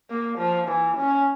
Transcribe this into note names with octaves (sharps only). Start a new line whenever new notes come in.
A#3
F3
E3
C#4